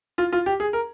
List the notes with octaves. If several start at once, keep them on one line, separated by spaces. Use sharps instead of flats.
F4
F4
G4
G#4
A#4